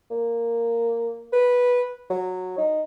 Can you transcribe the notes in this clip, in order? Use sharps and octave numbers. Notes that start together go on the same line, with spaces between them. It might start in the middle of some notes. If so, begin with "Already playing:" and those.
A#3
B4
F#3
D#4